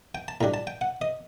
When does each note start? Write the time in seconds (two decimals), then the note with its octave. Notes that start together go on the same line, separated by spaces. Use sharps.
0.15 G5
0.28 A5
0.41 A2 G3 D4 A#5
0.54 A5
0.67 G5
0.81 F#5
1.01 D#5